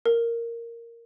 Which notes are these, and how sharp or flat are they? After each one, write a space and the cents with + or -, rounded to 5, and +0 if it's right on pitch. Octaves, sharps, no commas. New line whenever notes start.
A#4 -5